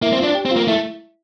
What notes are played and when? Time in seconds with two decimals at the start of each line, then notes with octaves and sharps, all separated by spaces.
0.02 A#3 E4 E5
0.13 C4
0.18 F4 F5
0.23 D4
0.34 G4 G5
0.45 C4
0.51 F4 F5
0.56 A#3
0.67 A3 E4 E5